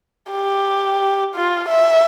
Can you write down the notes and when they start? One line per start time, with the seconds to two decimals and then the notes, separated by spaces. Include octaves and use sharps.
0.31 G4
1.35 F4
1.68 E5